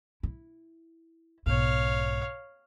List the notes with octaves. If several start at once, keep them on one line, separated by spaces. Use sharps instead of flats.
E4
B1 G#2 C#5 F5